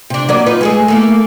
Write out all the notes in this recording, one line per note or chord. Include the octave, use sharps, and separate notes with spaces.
C3 D4
F#3 A#3 D5
D#4 F4 B4
G#3 A3 G#4
A3 A#3 E4